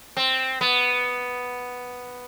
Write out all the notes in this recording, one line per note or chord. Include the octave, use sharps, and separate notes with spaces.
C4
B3